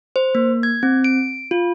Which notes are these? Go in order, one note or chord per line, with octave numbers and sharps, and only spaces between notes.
C5
A#3
G#6
C4
D7
F4